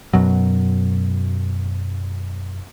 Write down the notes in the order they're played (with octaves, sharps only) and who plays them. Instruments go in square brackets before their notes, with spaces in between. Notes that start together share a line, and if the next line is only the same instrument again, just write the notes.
[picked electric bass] F#2 B2 F#3